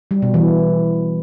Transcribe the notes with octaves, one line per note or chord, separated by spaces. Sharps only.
G3
B2
E3